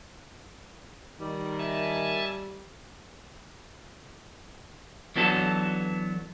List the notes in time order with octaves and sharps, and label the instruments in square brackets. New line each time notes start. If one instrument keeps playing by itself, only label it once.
[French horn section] D#3 [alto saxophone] G3
[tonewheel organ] E5 G#5 A5
[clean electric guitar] E3 F#3 B3 D4 F#4 A4